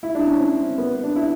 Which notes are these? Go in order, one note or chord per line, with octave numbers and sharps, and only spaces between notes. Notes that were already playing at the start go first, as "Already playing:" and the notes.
E4
D4
C#4
C4
B3
D4
E4